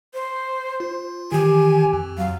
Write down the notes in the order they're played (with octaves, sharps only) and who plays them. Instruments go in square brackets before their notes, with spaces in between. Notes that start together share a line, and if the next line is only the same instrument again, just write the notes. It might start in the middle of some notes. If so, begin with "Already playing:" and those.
[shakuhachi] C5
[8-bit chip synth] F4
[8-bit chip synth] D#3 E3 [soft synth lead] G4 [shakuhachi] G#5
[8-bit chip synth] F2
[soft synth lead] F#3 [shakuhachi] F5